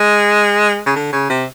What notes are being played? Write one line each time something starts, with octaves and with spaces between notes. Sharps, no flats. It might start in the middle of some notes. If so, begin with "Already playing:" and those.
Already playing: G#3
C#3
D3
C#3
C3